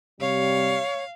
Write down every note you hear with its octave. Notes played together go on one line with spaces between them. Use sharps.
C3 G3 C#5 F5